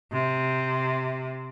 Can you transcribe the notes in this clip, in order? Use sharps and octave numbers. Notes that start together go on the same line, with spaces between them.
C3